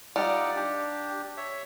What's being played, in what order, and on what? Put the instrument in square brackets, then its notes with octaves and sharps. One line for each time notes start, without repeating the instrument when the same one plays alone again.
[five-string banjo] G3 F4 [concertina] D#4 D5 F#5
[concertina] D4 G4
C#5 E5